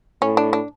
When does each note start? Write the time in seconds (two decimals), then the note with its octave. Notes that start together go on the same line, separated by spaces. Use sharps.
0.21 A2 C#4
0.37 D4
0.53 D4